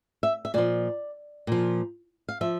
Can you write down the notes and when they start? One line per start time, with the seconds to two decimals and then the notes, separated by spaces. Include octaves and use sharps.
0.23 E5
0.45 E5
0.54 A#2 F3 D5
1.47 A#2 F3
2.29 F5
2.41 F3 E5